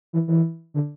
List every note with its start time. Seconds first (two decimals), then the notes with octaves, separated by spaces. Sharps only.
0.13 E3
0.28 E3
0.74 D3